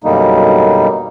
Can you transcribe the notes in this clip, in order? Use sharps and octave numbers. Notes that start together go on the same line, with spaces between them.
F#2 B2 D3 G3 A#3 D#4